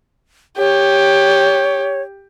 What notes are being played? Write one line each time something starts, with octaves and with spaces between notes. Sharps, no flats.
G4 C#5